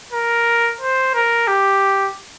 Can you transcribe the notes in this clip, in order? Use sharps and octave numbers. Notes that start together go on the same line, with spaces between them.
A#4
C5
A#4
G4